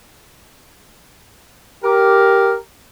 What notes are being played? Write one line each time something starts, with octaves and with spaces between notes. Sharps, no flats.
G4 A#4